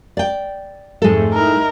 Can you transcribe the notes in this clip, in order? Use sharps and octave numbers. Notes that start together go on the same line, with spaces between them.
D5 G5
F2 G#2 G#3 A3 A4
D#4 E4 A#4